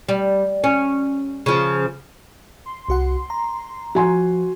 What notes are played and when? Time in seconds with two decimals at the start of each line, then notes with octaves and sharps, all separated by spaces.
0.09 G3
0.64 C#4
1.46 C#3 F3
2.66 C6
2.88 C2 F#4 F#5
3.30 A#5
3.95 F3 F#4 G#5 C6